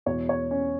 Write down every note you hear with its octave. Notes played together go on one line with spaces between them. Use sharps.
E2 B2 G#3 C#5
C#5
C#4